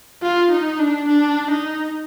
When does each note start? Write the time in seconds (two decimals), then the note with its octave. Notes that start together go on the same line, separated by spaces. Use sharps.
0.22 F4
0.51 D#4
0.79 D4
1.08 D4
1.51 D#4